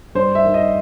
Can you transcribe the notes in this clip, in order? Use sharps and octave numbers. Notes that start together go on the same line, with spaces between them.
G2 C5
E5
D#3
D#5